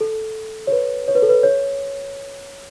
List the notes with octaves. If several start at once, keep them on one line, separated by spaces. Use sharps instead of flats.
A4
C#5
B4
C#5
B4
A4
B4
C#5